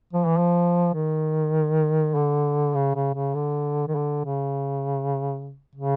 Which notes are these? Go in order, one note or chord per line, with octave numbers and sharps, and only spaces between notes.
F3
E3
F3
D#3
D3
C#3
C#3
C#3
D3
D#3
D3
C#3
C#3